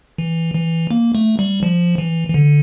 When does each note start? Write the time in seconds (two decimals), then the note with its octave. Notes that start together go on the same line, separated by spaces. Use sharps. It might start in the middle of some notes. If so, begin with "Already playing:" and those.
0.18 E3
0.55 E3
0.91 A#3
1.15 A3
1.39 G3
1.63 F3
1.98 E3
2.29 E3
2.34 D3